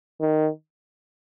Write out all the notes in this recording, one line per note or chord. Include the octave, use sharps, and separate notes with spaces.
D#3